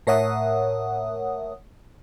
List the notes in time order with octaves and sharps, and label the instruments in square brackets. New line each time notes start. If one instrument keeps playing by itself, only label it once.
[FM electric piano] A2 A#4 C#5 E5 F#5 D#6